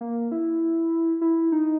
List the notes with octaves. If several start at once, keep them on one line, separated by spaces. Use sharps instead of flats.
A#3
E4
E4
D#4